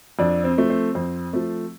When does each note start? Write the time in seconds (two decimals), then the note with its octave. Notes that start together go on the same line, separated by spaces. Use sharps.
0.19 F2 D4
0.44 C4
0.58 F3 A3
0.70 C4
0.95 F2 C4
1.33 F3 A3